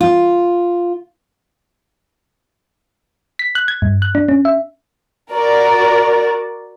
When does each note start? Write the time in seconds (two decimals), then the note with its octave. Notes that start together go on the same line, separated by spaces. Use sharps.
0.01 F4
3.39 B6
3.55 F#6
3.68 G#6
3.82 G2
4.02 F#6
4.15 D4
4.29 C#4
4.45 E5
5.31 F#4 A#4 D5